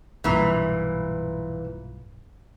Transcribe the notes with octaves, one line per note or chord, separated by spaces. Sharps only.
B1 G2 A#2 E3